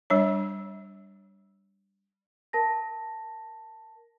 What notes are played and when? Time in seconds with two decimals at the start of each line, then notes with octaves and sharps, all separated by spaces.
0.10 G3 D4 C#5
2.53 A#4 A5 A#6